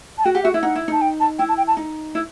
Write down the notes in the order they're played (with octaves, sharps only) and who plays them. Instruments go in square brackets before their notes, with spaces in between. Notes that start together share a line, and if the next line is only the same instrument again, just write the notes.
[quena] A5
[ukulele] F#4 [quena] G5
[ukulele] G4 [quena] F#5
[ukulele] F#4 [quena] E5
[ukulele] E4 [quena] E5
[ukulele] D#4 [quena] F#5
[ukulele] E4
[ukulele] D#4 [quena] A5
[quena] G5
A5
[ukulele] E4 [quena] G5
[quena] A5
G5
A5
[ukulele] D#4
E4